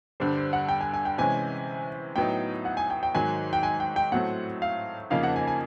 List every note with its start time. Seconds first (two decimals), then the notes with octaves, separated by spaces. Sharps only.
0.20 G2 D3 G3 C5
0.37 C5
0.53 F#5
0.69 G5
0.81 G#5
0.94 G#5
1.05 G5
1.18 C3 E3 G#3 C#4 G#5
2.16 A2 F#3 B3 D#4 G5
2.65 F#5
2.77 G#5
2.90 G5
3.03 G5
3.15 G#2 D#3 F#3 G#5
3.53 G5
3.63 G#5
3.80 G5
3.96 G5
4.12 A2 F#3 A3 C4 F#5
4.62 F5
5.10 F2 C#3 F3 A#3 D#4 F5
5.23 F#5
5.36 G#5
5.47 G#5